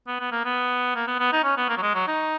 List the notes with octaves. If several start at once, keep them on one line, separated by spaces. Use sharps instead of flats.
B3
B3
A#3
B3
A#3
B3
B3
D#4
C#4
B3
A#3
F#3
G#3
F#3
D#4